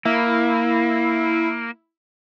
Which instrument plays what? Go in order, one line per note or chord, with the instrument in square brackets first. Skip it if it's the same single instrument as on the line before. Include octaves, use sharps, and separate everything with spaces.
[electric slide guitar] A#3 [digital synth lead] E4